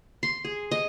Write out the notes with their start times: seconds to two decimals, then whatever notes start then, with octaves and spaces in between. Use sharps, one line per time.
0.23 C6
0.45 G#4
0.71 D#5